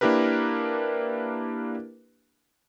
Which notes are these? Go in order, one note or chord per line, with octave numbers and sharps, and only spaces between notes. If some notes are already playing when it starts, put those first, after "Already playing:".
A#3 D4 E4 G4 A#4 B4